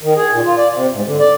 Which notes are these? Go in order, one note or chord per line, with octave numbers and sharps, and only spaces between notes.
D#3
G#4
A#2
F4
D5
C3
G#2
D3
D5